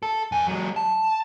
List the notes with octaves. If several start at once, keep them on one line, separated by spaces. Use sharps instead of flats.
A4
F2 G#5
F#3 G#3
A5